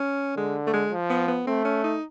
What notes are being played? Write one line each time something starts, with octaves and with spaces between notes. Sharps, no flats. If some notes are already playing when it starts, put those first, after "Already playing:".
Already playing: C#4
D3 G#3
A3
G#3
F3
B3
B3
A3 C4
C#4
D#4